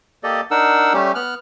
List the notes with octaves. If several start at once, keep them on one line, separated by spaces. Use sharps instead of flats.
A#3 G4 A4 D5 D#5
D4 D#4 A#4 F#5 E6
G3 A3 C#4 G4
B3 F6 F#6